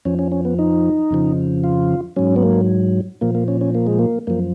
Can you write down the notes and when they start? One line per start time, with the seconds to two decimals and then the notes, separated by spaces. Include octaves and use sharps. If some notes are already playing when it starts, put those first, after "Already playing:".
0.05 F2 F3 C#4
0.19 C#4
0.32 C#4
0.45 B3
0.59 D#4
1.11 F2 C#3 F3
1.64 F4
2.16 G#2 F#3 C#4
2.36 B3
2.43 A#3
3.21 A#2 F3 A#3
3.35 A#3
3.48 C#4
3.61 C#4
3.75 A#3
3.87 G#3
3.99 A#3
4.27 F#2 F3 A#3